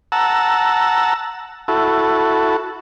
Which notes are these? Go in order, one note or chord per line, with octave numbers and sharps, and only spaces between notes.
F#5 A5 A#5 E6
E4 F#4 A4